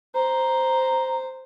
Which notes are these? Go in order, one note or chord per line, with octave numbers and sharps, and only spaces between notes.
C5 A#5